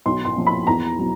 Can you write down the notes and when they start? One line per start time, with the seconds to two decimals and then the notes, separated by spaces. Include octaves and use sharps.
0.06 B1 C6
0.25 C6
0.37 A#2 F3
0.47 B5
0.67 E2 A#5
0.98 B2 F#3